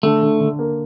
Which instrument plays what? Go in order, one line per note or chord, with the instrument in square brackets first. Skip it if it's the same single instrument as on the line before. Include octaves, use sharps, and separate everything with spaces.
[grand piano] D3 [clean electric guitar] A3
[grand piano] D3
D3
A#3